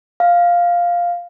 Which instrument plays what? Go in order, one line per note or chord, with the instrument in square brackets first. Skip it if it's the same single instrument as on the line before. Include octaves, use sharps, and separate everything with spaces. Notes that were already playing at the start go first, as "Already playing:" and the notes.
[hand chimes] F5